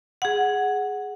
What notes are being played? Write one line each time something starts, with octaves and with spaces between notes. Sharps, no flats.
G#4 F#5